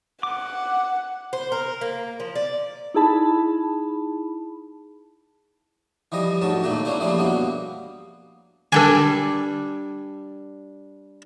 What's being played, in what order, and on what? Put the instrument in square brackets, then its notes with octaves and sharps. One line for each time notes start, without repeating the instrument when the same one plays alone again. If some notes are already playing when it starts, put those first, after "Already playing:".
[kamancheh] F#5 [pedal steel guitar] D6
[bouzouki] C5
A#4
A#3
F3
D5
[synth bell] D#4 E4 G#4 A5 B5
[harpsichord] E3 F3 G3 D#5
D2 G#2 F#3 A5
A#2 D#3 A3 A#3
A#3 C#4 D4 E4
C#3 E3 F3 G3 A3 A#3
G2 B2 A#3 B3
[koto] G3 D4 [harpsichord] A4 G5 G#5